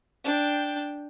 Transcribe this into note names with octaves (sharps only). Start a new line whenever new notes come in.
D4 G5